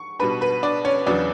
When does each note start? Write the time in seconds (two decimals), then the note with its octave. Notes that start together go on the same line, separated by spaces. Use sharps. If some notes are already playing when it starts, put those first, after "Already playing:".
Already playing: C#6
0.19 B2 G3 D4 B4 B5
0.41 B4 B5
0.63 D4 D5
0.85 C#4 C#5
1.06 E2 C#3 F#3 B3 D4 D5